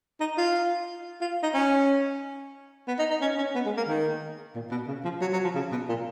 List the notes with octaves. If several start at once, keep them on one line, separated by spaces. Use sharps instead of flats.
D#4
F4
F4
D#4
C#4
B3
D#4
D#4
C#4
C#4
B3
G#3
A#3
D#3
A#2
B2
C#3
F3
F#3
F#3
F3
C#3
B2
A#2